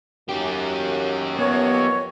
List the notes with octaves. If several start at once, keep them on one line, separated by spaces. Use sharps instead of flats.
F#2 D#4 G4
F3 B3 A#4 C#5